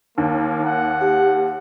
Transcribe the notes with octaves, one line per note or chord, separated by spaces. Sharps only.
D#2 A#3
F#5
G4